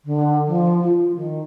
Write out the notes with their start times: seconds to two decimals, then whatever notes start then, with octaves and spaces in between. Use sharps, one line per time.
0.05 D3
0.47 F3
0.82 F4
1.15 D#3